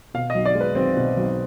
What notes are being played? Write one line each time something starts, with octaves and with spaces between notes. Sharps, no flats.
B2 F5
D#5
B1
D5
G#3
B4
B1 C4
B2
B1